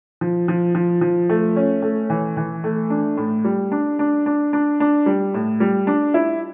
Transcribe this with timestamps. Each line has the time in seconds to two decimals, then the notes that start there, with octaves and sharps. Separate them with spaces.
0.21 F3
0.48 F3
0.75 F3
1.01 F3
1.29 A3
1.56 C#4
1.82 A3
2.10 E3
2.37 E3
2.64 A3
2.90 D4
3.17 A2
3.45 G3
3.72 D4
3.99 D4
4.26 D4
4.53 D4
4.80 D4
5.06 G3
5.34 A2
5.60 G3
5.87 D4
6.14 E4